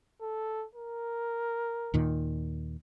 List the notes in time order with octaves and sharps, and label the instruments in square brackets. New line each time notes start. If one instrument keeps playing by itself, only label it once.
[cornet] A4
A#4
[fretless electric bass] D#2 A#2 D#3